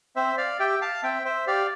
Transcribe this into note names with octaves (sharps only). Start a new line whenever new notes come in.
C4 C5 E5
D5 F5
G4 E5 G5
F5 A5
C4 E5 G5
C5 E5
G4 D5 F5